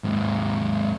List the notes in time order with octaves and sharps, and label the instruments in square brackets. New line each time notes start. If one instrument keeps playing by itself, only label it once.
[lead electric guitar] D#2 G#2